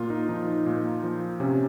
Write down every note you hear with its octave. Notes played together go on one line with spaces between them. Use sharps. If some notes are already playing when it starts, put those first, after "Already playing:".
Already playing: A#2 F4
D#4
F3 D#4
D#4
A#2
F3
C3 C#4